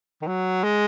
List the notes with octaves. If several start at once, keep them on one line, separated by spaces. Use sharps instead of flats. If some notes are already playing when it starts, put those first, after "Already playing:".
D#3
F#3
G#3